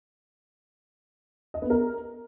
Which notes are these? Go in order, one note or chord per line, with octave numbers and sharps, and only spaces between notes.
D#5
B3
A#4